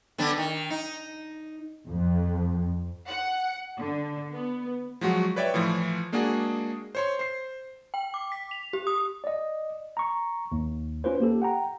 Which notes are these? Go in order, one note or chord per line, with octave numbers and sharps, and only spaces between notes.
D3 B3 D4
D#3
D#4
F2
F#5
D3
B3
F3 F#3 G#3 F#4
B4 C#5 D5 E5 G5
A2 E3 F3
G#3 A#3 D4 F#4 G#4
C5 C#5 C6
C5 C7
G5
D6
B6
F7
G4
D#6
D5 D#5
A#5 C#6
D#2
C#4 F4 B4 C5
A#3 G4 A4
F#5 G5 A#5